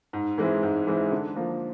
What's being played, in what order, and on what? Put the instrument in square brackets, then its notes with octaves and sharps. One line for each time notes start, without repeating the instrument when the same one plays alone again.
[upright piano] G#2
E3 G#3 C4 E4
G#2
E3 G#3 C4 E4
D3
F3 A#3